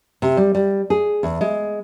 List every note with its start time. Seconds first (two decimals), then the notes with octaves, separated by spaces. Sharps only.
0.22 C3
0.37 G3
0.55 G3
0.90 G#4
1.23 E2
1.41 G#3